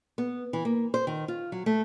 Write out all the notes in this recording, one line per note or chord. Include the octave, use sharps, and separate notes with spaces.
B3
E3
A#3
C5
D#3
F4
F#3
A3